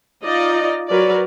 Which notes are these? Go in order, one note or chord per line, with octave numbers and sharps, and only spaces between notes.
D#4 F4 D5 D#5
F#3 A#4 B4 D5